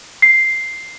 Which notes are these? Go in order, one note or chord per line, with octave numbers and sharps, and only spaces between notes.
C7